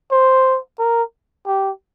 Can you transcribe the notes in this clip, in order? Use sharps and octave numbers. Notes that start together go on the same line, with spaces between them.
C5
A#4
G4